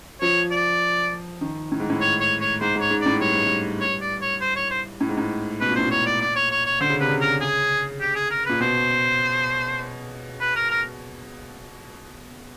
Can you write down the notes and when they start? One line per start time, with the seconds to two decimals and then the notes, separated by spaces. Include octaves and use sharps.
0.21 F3 C#5
0.51 D5
1.41 D#3
1.72 A2
1.80 G#2
1.90 A2
2.01 C#5
2.21 C#5
2.41 C#5
2.61 G#2 C5
2.76 G#2
2.81 C#5
2.91 G#2
3.01 A2 D5
3.21 G2 C#5
3.34 G#2
3.47 G2
3.81 C#5
4.01 D5
4.22 C#5
4.41 C5
4.56 C#5
4.71 C5
5.01 A2
5.09 G#2
5.17 A2
5.61 B2 B4
5.70 A#2
5.76 A2 C5
5.86 A#2 C#5
6.06 D5
6.21 D5
6.36 C#5
6.51 C#5
6.66 C#5
6.80 D3 C5
6.90 C#3
7.00 C3 B4
7.09 C#3
7.21 A#4
7.41 G#4
8.01 G4
8.15 G#4
8.30 A#4
8.46 A#2 B4
8.61 B2 C5
10.41 B4
10.56 A#4
10.71 A#4